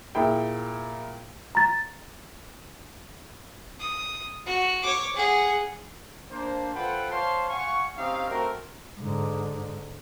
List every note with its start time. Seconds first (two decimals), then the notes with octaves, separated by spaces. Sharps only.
0.15 A#2 E4 G#4 G5
1.55 A#5 A6
3.79 D#6
4.46 F#4
4.82 C#5 D6
5.15 G#4 F#5
6.31 A#3 D4 C5
6.75 F4 A4 B4 C5 F#5 G5
7.11 C5 C#5 F5 A5 C6
7.49 F5 F#5 G#5 C#6
7.98 C4 C#4 D#4 G4 F5
8.29 A3 C4 F#4 A#4
8.99 G#2 D3